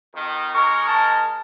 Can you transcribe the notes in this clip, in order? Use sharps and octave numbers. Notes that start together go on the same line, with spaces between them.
F2 D#3
G#3 D#4 A#4 C#6
A5